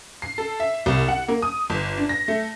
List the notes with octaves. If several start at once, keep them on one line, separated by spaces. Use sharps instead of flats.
C7
A4
E5
C2
F#5
A#3
D#6
G1
D4
A#6
A3